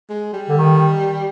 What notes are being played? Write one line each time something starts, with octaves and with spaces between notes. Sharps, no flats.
G#3
G3
D3
D#3